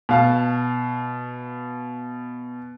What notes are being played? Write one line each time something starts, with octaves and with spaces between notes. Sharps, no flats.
B2 F5 A5